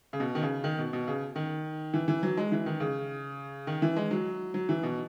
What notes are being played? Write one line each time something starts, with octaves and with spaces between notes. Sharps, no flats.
C#3
B2
D#3
C#3
D#3
B2
B2
C#3
D#3
E3
E3
F#3
G#3
E3
D#3
C#3
D#3
E3
G#3
F#3
F#3
E3
B2